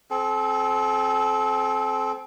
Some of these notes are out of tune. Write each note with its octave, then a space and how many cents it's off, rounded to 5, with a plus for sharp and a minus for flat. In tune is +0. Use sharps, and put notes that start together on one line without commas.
C4 +5 A4 -35